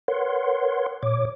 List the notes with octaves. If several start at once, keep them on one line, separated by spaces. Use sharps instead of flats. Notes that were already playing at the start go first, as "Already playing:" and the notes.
A#4 B4 C#5 F#5 C6
A#2 C#5 D6